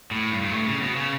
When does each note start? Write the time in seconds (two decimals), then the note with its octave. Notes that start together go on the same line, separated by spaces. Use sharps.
0.11 A2
0.32 G2
0.42 G2
0.51 A2
0.66 C#3
0.81 B2
0.96 C#3